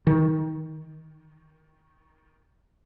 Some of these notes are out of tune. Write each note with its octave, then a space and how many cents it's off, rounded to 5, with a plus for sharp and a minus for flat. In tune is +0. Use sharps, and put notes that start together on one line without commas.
D#3 +15